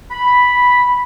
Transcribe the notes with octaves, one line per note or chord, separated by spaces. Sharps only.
B5